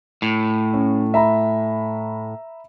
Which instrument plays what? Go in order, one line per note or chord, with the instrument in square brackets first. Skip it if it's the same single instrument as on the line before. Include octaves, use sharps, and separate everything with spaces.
[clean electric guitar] A2
[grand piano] C#4
E5 A#5 B5